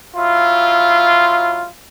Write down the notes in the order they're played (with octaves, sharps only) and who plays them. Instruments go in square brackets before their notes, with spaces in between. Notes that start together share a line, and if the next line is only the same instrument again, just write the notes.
[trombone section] F#3 E4 F4